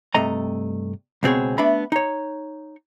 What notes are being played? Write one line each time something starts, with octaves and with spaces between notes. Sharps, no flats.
G2 C3 A3 D#5 A#5
C#2 B2 C4 G#4 C#5
A3 B3 D4 E5 B5
D#4 C#5